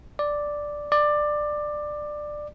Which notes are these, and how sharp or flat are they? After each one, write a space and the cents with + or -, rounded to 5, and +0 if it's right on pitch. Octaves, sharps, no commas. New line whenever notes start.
D5 +0
D5 +15